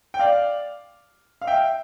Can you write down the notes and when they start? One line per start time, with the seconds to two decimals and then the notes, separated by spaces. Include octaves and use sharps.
0.14 G5
0.19 D5 F5
1.42 F5
1.47 E5 G5